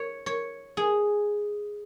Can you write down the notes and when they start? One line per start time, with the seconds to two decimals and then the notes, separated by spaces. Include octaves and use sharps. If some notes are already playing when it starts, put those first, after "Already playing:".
Already playing: C#5
0.26 C#5
0.77 G#4